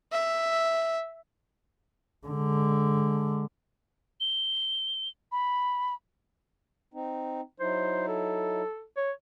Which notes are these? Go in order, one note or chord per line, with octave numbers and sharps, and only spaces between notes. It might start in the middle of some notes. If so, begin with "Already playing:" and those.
E5
D3 G#3
G7
B5
C4 D#4
F#3 D#4 E4 C5
A4
C#5